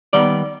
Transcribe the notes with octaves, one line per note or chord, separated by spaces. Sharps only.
D#3 G3 B3 D5